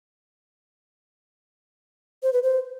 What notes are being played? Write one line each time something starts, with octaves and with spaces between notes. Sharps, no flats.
C5
B4
C5